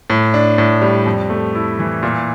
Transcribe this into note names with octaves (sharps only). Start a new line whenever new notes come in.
A2
D4
A2
G3
F2
A3
E4
E3
A#2